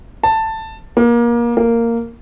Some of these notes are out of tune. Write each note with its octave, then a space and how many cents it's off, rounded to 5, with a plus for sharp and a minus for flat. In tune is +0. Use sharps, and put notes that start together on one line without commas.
A5 +10
A#3 +25
A#3 -10